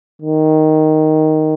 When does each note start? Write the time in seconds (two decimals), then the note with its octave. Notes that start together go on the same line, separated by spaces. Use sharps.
0.22 D#3